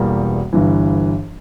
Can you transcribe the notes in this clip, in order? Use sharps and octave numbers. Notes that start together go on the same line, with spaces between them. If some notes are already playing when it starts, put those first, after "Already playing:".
Already playing: E1 E2 E3 G3 A#3
G1 G2 E3